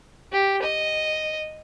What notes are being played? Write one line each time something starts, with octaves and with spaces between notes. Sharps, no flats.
G4
D#5